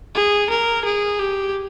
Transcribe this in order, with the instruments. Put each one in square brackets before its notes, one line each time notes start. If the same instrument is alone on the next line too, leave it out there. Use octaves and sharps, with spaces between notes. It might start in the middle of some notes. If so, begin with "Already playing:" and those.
[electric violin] G#4
A#4
G#4
G4